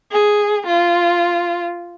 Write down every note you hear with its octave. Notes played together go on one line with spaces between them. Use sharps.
G#4
F4